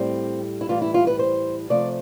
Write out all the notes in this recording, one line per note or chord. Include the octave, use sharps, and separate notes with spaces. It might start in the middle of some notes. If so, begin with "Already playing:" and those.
Already playing: A2 G3 C4
E4
A2 E3 G3 F4
E4
F4
B4
C5
C3 F3 A3 D5